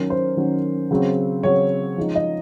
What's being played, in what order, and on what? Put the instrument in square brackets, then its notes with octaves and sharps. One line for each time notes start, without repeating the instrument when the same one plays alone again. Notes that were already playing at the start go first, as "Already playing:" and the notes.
Already playing: [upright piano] D#3 F#3 C#4 A#4
C5
D#3 F#3 C#4
C#3 F#3 C4
C#3 F#3 C4 C#5
F3 G#3 D#4
D#5